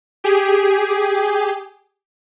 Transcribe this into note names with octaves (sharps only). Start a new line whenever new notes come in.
G4 G#4